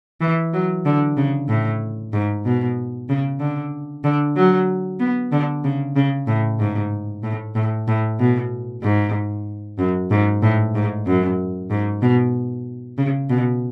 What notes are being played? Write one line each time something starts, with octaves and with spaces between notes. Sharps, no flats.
E3
F#3
D3
C#3
A2
G#2
B2
C#3
D3
D3
F#3
B3
D3
C#3
C#3
A2
G#2
A2
A2
A2
B2
G#2
F#2
G#2
A2
G#2
F#2
G#2
B2
C#3
B2